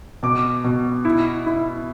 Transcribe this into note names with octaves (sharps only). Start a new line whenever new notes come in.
B2 D6
B2
E4
E4